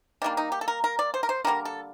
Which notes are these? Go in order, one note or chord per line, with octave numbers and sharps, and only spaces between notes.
D#3 G3 A#3 D4
D#4
G4
A4
A#4
A#4
D5
C5
A#4
C5
D3 G3 A#3 A#4
A4